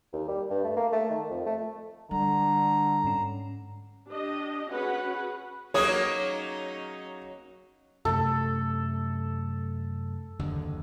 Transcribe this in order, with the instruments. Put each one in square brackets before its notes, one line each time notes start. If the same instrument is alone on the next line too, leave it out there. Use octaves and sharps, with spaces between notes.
[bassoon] D#2
G3
G2
A3
A#3
A3
D#3
F2
A3
[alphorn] D3 [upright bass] G3 [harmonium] A#5
[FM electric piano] G#2 C#4
[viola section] D4 G4 D#5
C#4 F#4 G#4 B4 F#5 B5
[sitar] F#3 A#3 G#4 [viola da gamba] C#4 D#4 [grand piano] C#5 D#6
[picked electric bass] F#2 C3 A3 [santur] A4
[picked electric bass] F#1 D#2 D3